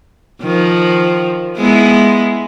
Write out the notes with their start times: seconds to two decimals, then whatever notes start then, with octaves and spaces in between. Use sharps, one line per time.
0.42 D#3 F3
1.57 G#3 B3 E4